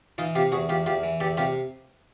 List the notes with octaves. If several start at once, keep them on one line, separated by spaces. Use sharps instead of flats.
E3 D#4 F4
C3 F4 G4
E2 F#4 G#4
E2 F4 G4
E2 F4 G4
E3
E2 G4 A4
C3 F4 G4